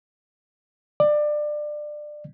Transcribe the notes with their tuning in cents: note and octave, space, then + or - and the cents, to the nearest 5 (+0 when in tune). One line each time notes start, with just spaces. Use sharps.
D5 +25